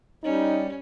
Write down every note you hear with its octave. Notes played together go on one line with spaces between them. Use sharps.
G3 C#4 D#4